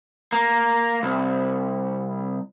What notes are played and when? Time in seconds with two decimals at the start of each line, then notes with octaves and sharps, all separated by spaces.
0.32 A#3
1.03 C2